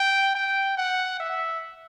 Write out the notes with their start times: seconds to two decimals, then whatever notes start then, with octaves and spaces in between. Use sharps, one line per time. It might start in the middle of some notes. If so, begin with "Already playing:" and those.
Already playing: G5
0.35 G5
0.78 F#5
1.20 E5